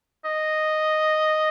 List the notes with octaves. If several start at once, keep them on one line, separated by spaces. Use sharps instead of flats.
D#5